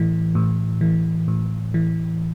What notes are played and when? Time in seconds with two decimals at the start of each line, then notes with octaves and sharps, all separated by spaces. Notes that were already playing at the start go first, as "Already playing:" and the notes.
Already playing: A2 E3
0.35 A2
0.81 E3
1.28 A2
1.74 E3